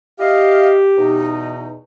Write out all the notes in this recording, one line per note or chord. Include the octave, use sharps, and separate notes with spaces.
E4 G4 D#5 F5
E2 B2 D#4